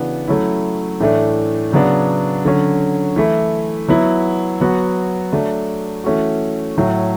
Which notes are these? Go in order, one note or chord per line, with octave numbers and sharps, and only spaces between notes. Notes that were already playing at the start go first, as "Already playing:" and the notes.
Already playing: C#3 E3 B3 D4 F#4
F#3 A3 C#4 E4
A2 E3 A3 D4
C#3 F#3 B3 D4
D3 F#3 C#4
E3 A3 E4
F#3 B3 E4
F#3 B3 F#4
F#3 A3 D4
E3 A3 C#4 F#4
A2 F#3 A3